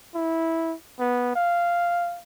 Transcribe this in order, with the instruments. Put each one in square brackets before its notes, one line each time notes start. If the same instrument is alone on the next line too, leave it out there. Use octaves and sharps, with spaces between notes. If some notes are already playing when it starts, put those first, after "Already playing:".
[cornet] E4
B3
F5